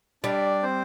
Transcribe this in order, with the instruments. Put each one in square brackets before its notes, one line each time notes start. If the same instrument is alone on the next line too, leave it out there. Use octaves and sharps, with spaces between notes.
[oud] G3 [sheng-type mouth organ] D4 D5
[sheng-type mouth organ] C4 C5